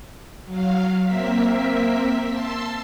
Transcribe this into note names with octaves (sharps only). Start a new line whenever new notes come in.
F#3 F5
A#3 C4 A#4 E5 B6
A5 C6 E6